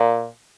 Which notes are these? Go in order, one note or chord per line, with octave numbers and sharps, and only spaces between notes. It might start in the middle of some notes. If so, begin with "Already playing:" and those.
Already playing: A#2